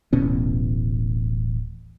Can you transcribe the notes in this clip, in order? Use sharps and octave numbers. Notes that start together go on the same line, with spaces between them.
D1 A1 B2 C#4